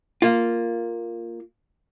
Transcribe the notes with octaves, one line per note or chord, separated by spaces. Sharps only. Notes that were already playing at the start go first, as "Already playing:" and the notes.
A#3 F4